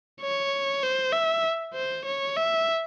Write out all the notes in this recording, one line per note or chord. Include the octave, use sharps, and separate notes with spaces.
C#5
C5
E5
C5
C#5
E5